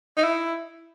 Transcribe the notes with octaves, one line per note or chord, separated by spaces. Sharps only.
D#4
E4